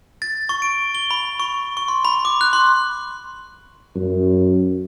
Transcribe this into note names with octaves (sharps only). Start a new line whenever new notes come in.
A6
C#6
D7
G7
B5
C#6
C#6
C6
B5
D6
F#6
C6
F#2